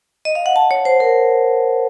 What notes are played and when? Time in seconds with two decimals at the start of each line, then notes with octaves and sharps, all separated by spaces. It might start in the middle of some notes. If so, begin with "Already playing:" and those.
0.25 D#5
0.35 F5
0.46 F#5
0.56 A5
0.71 C#5
0.85 C5
1.00 A#4